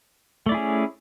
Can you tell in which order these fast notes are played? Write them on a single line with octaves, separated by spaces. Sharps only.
A3 D5 E4 G#4 C#4